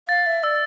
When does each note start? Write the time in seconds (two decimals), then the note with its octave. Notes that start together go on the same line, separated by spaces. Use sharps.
0.08 F5 A6
0.26 E5
0.43 D5 E6